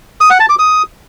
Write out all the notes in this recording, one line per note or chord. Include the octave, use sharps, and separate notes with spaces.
D#6
F#5
A5
D6
D#6